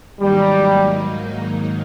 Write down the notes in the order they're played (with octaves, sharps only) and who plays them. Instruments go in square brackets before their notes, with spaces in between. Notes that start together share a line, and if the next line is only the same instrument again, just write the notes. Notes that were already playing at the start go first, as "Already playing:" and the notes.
[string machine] G#2 D#3 F#3 A#3 D#4 [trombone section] G3